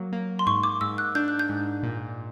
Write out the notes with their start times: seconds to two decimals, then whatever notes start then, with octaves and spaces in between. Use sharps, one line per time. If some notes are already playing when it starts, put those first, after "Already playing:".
Already playing: F#3 A#3
0.12 A#3
0.39 C6
0.46 G#2 C#6
0.63 D6
0.81 G#2 E6
0.98 F#6
1.15 D4 G6
1.28 F#6
1.39 G6
1.49 G#2
1.83 A#2